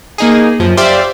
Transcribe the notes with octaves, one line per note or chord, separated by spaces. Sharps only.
A#3 D#4 G#4
F#2 F3
G4 C5 D5 E5 F5